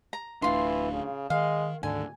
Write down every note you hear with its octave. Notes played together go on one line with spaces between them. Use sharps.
A#5
D1 E3 A3 D4 F4 C6
C#3
D#3 G#3 F5
D2 G#2 D3 D#3 G#5